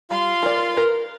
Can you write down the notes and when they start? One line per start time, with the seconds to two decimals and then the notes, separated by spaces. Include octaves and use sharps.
0.11 G3 F4 F5 C6
0.43 A#4 D5
0.77 A#4 B4